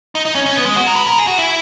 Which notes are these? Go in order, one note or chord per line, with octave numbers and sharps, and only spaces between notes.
D#4
D#4
C#4
C#4
B3
G#3
F#4
A#4
B4
A#4
G#4
F#4
E4